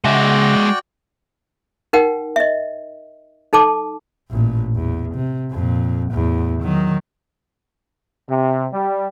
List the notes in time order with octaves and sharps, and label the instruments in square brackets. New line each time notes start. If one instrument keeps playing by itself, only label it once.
[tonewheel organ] C#3 F#5 A#6 [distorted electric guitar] G#3 E5 [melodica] F#4 D5 G5
[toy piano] D#4 A#4 F#5 G5
D#5 E5
D#4 A4 A5 D6
[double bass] A1 A#2
E2
C3
F2 A#2
E2 A2
D#3 F#3
[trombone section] C3
G3